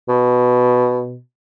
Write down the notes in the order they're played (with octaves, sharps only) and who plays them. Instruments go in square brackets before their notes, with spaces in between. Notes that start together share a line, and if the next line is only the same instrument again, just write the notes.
[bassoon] B2